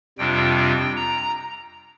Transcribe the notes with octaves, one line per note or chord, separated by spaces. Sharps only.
F2 C3 G3 D4 F4 G5
G5
A#5